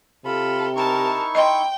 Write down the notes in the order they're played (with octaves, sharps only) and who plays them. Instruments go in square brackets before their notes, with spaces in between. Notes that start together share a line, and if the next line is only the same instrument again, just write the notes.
[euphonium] C3 [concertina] F4 B5 [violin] A4
[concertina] D#4 E4 C#6 [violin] A#4 A5
[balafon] D#5 C6 [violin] G5